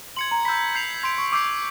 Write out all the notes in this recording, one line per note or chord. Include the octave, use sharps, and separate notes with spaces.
C6 G#6 C#7 F#7
A#5
B5 E6 G6 B6
G6 C7 F7
C6 G6 B6 D7 F7
C#6
C#6 D6 E6 G6 C7